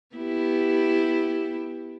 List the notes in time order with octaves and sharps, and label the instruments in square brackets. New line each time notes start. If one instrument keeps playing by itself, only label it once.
[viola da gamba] B3 E4 G4